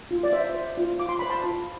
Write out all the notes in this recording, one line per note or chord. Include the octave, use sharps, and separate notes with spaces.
F4
D5
C5 E5
C5
F4
F4 D6
C6
C5 B5
A5 C6
F4